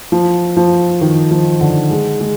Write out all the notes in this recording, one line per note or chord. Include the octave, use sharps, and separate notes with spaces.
F3
F3
D#3
F3
D3
G#3
G#3